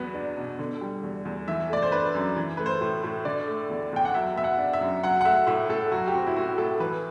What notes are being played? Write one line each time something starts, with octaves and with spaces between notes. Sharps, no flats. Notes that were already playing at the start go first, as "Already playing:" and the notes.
Already playing: E2 F#3 B3
D4
B2
D3
G3
E2
E2
E3 E5
A3 D5
C5
D4 B4
F#2
E3
A3 B4
C5
A2
A2
D3 D5
A3
E2
E2 G5
F#5
F#3 E5
B3 E5
F#5
D4
E5
F#2
F#3 F#5
F#5
A3 E5
A2 E5
A2 A4
F#3 F#4
G4
C4 F#4
E4
A2 F#4
A2 A4
E3 B4